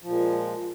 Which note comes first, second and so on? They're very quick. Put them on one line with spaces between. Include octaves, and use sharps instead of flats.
F3 A#2 G#3